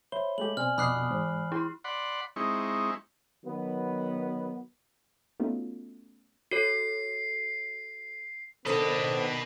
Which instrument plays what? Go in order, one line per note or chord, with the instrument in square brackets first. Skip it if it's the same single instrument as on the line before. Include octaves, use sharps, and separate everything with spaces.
[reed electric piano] C5 [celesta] C#5 E5 B5 [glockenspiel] G7
[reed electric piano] G#3 A3 G4 [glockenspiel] F#7
[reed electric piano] B2 C4 [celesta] D5 G#5 [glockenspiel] F6
[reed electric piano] F2 B2 D4 [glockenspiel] B5 F#6 C7 [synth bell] D6 D#6
[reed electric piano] G#2 [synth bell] E3
[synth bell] E4 [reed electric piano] G5 C6
[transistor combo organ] D5 F#5 B5 C6
G#3 C4 D#4 E4 C#6
[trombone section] D#3 F#3 B3
[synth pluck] A3 B3 C#4 D#4 F4 F#4
[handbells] F#4 A4 C#5 [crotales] C7
[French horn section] D#3 B3 [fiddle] D4 [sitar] A4 C5 [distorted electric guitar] B4 D#5